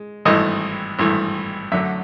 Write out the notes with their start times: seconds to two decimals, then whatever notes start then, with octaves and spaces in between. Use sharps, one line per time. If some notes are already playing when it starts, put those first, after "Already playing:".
Already playing: G#3
0.25 G#1 G2 E3 A3 D#5
0.99 G#1 G2 E3 A3
1.72 F#2 D3 F#3 A3 E5